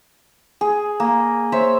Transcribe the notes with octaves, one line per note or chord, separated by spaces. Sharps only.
G#4
A#3
C5 C#5 E5 E6